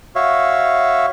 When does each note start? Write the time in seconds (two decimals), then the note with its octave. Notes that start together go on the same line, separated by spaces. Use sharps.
0.15 F#4 C#5 E5 F5